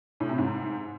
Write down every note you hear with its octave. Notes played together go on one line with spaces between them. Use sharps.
A2
C3
G#2